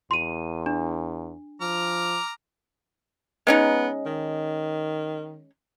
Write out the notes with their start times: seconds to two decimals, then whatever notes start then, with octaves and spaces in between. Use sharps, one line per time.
0.11 E2 C6 D#7
0.66 D4
1.61 F3 A#5 D6 F6
3.47 G#3 B3 C#4 D#4
4.06 D#3